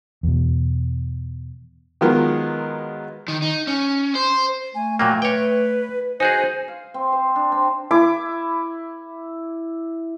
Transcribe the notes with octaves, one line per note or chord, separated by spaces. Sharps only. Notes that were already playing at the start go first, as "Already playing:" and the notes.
E2 B2
D#3 F#3 G#3 B3 F4 A#4
D#3
D#4
C#4
C5
A3 G#5
A#2 F#3 A#3 G5
B4 C#5 G5
D#4 F#4 G#4 C5 G#5
F5
C4
C5
D4
C4
E4 D6